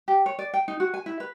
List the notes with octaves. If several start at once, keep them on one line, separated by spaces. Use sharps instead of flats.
G4
C#5
D5
G5
D#4
F#4
G#5
E4
B4